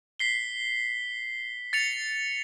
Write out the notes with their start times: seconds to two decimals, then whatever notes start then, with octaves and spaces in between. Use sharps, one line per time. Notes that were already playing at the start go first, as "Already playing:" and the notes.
0.19 B6 C7 G7
1.73 A6 C#7 F7